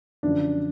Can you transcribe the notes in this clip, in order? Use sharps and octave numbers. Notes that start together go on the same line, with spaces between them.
F#2 D3 F3 D4